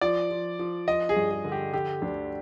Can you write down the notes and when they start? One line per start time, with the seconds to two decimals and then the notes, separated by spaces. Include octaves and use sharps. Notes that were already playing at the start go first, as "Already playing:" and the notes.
0.01 F3 D5
0.31 F3
0.59 F3
0.88 F3 D#5
1.09 G#4
1.16 G2
1.30 G#4
1.44 D3
1.52 G4
1.73 D3 G4
2.02 D2 D4